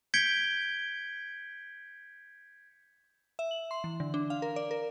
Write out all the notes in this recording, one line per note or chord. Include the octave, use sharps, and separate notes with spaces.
G6 G#6 B6 C#7 D7 G7
E5
F#7
C6
E3
D3
D4
F5
A#4
D5
A#4